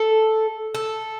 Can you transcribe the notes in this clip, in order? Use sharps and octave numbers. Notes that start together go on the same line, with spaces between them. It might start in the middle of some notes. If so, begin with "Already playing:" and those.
Already playing: A4
A4